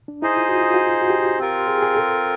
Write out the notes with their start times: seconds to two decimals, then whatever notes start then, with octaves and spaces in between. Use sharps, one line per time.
0.08 D4
0.22 D#4 E4 G#4 C5 D#5
0.37 F4
0.49 F#4
0.61 F4
0.74 F#4
0.87 F4
1.02 F#4
1.10 G4
1.39 C4 F4 A#4
1.68 G#4
1.82 G#4
1.97 A4